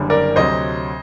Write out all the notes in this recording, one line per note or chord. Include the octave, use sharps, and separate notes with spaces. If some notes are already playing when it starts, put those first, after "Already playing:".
Already playing: F#1 F#2 D3 G3
A#4 D5
D2 C3 F#3 C5 D#5